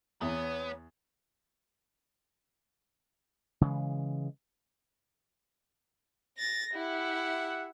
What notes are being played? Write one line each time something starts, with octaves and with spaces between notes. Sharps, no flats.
E2 B3 C#5
C#3 E3 G#3
A6 A#6
E4 G4 E5 F#5